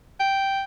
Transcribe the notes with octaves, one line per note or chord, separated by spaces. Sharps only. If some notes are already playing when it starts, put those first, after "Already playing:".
G5